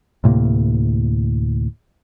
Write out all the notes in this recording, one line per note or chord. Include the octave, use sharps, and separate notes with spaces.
D2 A2 C3 A#3